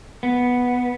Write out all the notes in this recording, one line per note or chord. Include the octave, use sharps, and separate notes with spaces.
B3